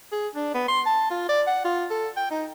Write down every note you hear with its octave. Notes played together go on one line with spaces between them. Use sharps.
G#4
D4
B3
C6
A5
F4
D5
F#5
F4
A4
G5
D#4